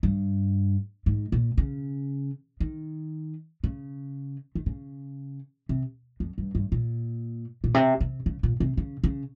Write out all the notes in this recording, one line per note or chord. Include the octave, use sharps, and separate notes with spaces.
G2
G#2
A#2
C#3
D#3
C#3
D#3
C#3
C3
F2
G2
G2
A#2
A#2
C3
C3
C#3
A#2
C3
C#3
C#3